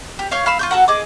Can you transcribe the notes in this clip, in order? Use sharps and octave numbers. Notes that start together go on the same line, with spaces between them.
G4
C#5 F5 C#6 G6
F5 B5 E6
F4 C#6 G6
F#4 A4 A#4 F#5
G#4 D#5 D6